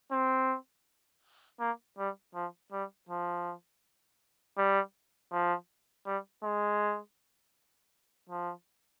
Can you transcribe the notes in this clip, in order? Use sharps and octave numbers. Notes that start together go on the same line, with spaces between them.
C4
A#3
G3
F3
G3
F3
G3
F3
G3
G#3
F3